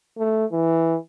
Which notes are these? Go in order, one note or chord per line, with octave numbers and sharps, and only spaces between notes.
A3
E3